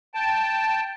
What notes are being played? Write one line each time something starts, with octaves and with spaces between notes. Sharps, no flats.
G5 A5